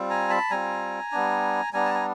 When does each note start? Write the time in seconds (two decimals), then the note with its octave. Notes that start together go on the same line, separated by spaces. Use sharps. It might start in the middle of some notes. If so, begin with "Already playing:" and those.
Already playing: G3 C4 F4
0.10 G#5 A#5
0.30 A5 B5
0.50 G3 C4 F4 G#5 A#5
1.12 G3 B3 D4
1.73 G3 B3 D4 G#5 A#5
1.85 A5
1.94 G#5